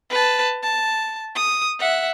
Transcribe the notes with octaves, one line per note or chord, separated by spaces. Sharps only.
B4 A5
A5
D#6
E5 F#5